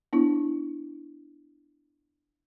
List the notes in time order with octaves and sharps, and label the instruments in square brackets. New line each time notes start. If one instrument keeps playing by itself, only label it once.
[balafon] B3 D4 E4